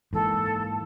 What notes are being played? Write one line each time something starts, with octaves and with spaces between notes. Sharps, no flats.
G#2 E3 A#3 A4